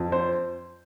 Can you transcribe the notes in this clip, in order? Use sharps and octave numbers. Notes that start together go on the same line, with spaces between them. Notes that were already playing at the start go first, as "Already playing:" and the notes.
Already playing: F2
C5